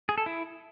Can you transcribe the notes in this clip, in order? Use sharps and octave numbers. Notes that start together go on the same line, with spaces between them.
G#4
A4
E4